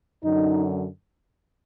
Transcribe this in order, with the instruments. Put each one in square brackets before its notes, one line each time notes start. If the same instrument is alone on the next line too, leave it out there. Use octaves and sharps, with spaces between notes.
[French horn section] F#2 D3 F#3 D#4